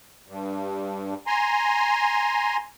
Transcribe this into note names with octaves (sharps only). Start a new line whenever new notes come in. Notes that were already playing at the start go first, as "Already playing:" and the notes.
G2
G#5 A#5 C6